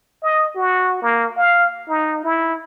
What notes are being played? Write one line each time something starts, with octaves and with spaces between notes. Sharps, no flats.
D#5
F#4
A#3
F5
D#4
E4